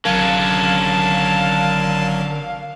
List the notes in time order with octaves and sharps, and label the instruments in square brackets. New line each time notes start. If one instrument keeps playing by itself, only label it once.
[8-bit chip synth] G#1 F#3 A#4 [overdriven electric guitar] D3 C#4 [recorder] F5 [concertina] A5